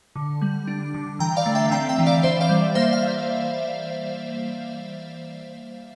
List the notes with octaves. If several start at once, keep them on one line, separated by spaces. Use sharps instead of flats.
D3
G3
D4
D3
E3 G5 A#5
D5 F5
A3
E5 G5
C4 G5 A#5
E5 G5
E3
D5 F5
E3 C5 E5
D5 F5
G3
A#3 C5 E5
F5